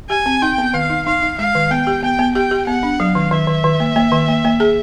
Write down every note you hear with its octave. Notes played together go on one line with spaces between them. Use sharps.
G4 G#5
C4
D#4 G5
B3
D#3 F5
D#4
D#4 F5
D#4
G#3 F5
D#3
B3 G5
G4
B3 G5
B3
G4 G5
G4
B3 F#5
D4
F#3 F5
D#3
D#3 E5
D#3
D#3
A#3
A#3
D#3
A#3
A#3
G#4